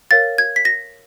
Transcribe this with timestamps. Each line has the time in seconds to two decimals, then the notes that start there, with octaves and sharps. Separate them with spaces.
0.11 A#4 C#5 F5 A6
0.38 G#6
0.56 B6
0.65 A#6